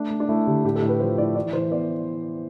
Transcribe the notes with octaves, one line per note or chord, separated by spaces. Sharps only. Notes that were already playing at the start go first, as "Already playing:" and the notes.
Already playing: A3 D4
A3
D4
A3 E4
D3 G4
A2 G4
A4
A2
B4
F3 C5
A2 D5
E3 D5
E3 C5
B3 D5